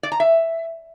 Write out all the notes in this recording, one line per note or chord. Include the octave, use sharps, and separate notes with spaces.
D5
A#5
E5